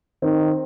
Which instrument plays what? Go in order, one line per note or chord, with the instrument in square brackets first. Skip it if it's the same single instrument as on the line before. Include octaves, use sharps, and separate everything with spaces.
[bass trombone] D#3 [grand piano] C4